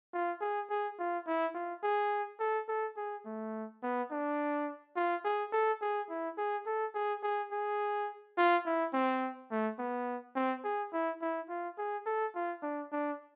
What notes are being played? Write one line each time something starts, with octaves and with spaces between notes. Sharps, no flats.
F4
G#4
G#4
F4
E4
F4
G#4
A4
A4
G#4
A3
B3
D4
F4
G#4
A4
G#4
E4
G#4
A4
G#4
G#4
G#4
F4
E4
C4
A3
B3
C4
G#4
E4
E4
F4
G#4
A4
F4
D4
D4